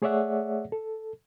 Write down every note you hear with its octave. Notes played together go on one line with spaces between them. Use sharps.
A3 G#4 C#5 D5 E5 F#5
A4